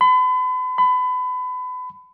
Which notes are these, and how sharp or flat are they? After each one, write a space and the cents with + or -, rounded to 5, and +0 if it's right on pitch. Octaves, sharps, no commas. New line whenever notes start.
B5 +40
B5 +30